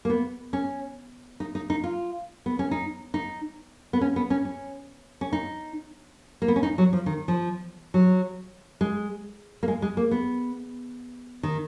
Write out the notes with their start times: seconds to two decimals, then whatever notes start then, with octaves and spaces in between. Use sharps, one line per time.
0.05 A#3
0.10 B3
0.53 C#4
1.40 D#4
1.55 D#4
1.70 D#4
1.84 F4
2.46 B3
2.59 C#4
2.71 D#4
3.14 D#4
3.93 B3
4.01 C#4
4.16 B3
4.30 C#4
4.45 C#4
5.21 C#4
5.33 D#4
6.42 A#3
6.48 B3
6.56 C#4
6.63 D#4
6.78 F#3
6.93 F3
7.06 D#3
7.28 F3
7.94 F#3
8.81 G#3
9.63 A#3
9.68 G#3
9.82 G#3
9.97 A#3
10.11 B3
11.43 D#3